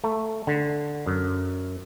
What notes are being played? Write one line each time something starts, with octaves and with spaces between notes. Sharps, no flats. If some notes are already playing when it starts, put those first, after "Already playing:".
A3
D3
F#2